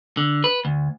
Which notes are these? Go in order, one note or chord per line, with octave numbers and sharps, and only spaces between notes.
D3
B4
D2